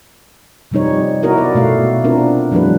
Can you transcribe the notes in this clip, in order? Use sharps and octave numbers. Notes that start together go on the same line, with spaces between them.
C3 F3 G3 D#4 C#5
B3 E4 F#4 A#4 D#5
D5
B2 A3 F#4 F5
B3 C4 D4 F4 A#4
E3 F#3 G#3 D4 B4